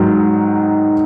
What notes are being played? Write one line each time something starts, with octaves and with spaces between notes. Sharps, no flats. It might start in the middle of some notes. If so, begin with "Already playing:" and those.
Already playing: G#2 D#3 F#3